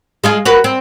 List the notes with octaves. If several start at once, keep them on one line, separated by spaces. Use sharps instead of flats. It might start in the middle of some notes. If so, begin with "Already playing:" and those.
G#3 F4 G#4
F#4 A#4 B4
C4